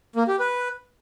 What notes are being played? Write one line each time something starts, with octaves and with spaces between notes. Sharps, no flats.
A#3
G4
B4